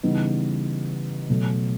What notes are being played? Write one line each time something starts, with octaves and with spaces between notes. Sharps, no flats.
C#3 E3 G3 B3 D#4
B2 F#3 A3